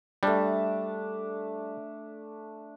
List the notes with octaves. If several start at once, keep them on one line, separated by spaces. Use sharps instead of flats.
G3 A3 D4